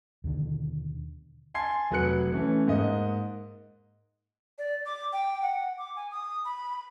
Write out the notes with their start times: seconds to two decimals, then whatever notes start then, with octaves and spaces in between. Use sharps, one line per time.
0.24 D#2 B2 D3 D#3
1.54 G#5 A5 C6 G#6 C7
1.91 F1 F#3 B4 F#6 C#7
2.32 E3 A3 C#4
2.67 G#2 A#3 D#5
4.58 D5
4.85 D6
5.12 G5
5.42 F#5
5.78 D6
5.96 G#5
6.11 D#6
6.45 B5